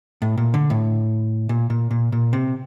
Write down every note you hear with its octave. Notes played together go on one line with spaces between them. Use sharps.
A2
A#2
D3
A2
A#2
A#2
A#2
A#2
C3